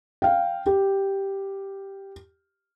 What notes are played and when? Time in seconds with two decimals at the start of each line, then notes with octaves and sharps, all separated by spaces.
0.22 F5 G5
0.66 G4